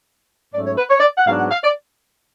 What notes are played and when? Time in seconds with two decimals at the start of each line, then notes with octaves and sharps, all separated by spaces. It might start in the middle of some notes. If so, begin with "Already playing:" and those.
0.54 G#2 F#3 A3 C#4 D5
0.66 C#5
0.78 B4
0.90 C#5
1.00 D5
1.18 F#5
1.26 G#2 F#3 B3 D4 F5
1.39 F#5
1.51 F5
1.64 D5